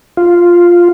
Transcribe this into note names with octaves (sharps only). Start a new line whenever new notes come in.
F4